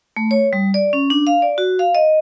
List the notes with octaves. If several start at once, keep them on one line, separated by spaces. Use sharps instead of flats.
A3
C#5
G3
D5
C#4
D4
F5
D5
F#4
F5
D#5